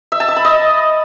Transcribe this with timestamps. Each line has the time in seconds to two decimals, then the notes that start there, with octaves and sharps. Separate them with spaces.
0.12 E5
0.20 A5
0.28 E6
0.36 B5
0.45 D#5